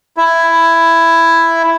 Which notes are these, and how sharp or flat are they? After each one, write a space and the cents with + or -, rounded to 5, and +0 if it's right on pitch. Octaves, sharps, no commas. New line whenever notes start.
E4 +10